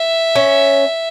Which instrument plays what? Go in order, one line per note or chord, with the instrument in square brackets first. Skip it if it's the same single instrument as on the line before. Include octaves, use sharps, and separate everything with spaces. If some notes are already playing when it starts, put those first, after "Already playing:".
Already playing: [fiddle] E5
[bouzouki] C#4